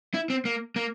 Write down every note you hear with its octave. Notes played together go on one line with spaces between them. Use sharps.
E4
C4
A#3
A#3